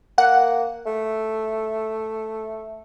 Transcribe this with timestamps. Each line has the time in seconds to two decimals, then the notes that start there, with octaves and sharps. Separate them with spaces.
0.18 A#3 F#5
0.86 A3